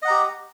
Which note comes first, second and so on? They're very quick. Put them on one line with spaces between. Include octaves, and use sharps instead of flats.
D#5 F#5 A#5 G4